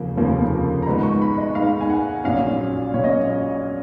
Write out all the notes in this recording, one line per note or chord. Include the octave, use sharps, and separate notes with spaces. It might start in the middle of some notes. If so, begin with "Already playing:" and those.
Already playing: F1 D#2 C#3 F3 A#3
F1 D#2 C#3 F3 A#3
A#5
G#2 D#3 G#3 B3 D#4 B5
C#6
B5
D#5
G#2 D#3 G#3 B3 D#4 F5
G#5
F#5
A#1 A#2 F#3 C#4 F5
A#2 F#3 C#4 C#5
D#5